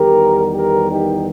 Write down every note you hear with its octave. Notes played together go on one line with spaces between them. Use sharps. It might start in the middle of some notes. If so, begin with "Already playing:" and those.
Already playing: E2 D#3 G3 B3 G4 A#4
G4 A#4
D#4 G4